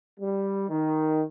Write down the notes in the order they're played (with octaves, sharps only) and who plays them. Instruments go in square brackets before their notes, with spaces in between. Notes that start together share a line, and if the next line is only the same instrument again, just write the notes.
[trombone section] G3
D#3